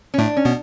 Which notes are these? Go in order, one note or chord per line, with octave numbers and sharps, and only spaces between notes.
C#4
A2 A3 D4
C#4
B2 B3